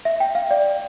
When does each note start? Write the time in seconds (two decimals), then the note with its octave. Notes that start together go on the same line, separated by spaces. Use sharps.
0.05 E5
0.20 G5
0.35 F5
0.51 D5